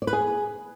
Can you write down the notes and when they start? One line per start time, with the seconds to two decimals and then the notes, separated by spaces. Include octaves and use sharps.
0.02 D5
0.07 B4
0.13 G#4